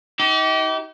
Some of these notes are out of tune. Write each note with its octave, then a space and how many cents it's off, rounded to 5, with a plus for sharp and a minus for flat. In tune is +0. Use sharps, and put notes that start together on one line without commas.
D#4 +40 G4 -30